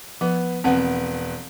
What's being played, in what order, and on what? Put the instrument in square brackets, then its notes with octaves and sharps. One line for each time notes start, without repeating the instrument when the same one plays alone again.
[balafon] F3 [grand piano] B3
[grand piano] E1 B3 [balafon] C4 F#5